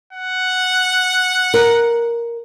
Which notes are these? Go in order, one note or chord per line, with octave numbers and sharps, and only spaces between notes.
F#5
A#4